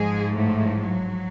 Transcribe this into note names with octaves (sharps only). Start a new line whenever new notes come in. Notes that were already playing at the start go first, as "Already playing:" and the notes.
Already playing: G#2 F3 G#3 G#4
A2 A3
F#3